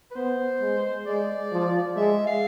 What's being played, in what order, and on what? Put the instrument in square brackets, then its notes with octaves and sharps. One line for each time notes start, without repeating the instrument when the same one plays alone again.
[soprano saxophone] B4
[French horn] B3 [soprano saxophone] C5
[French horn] G#3
[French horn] G#3 [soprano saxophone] D5
[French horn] F3
[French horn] G#3 [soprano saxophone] E5
[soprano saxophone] F5